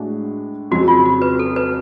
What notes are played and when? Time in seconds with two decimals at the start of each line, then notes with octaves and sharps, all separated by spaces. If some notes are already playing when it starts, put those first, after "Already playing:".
Already playing: A2 G#3 D4 F#4
0.71 F2 C#3 F#3 F#4
0.88 F4
1.05 F#4
1.22 B4
1.39 A4
1.56 B4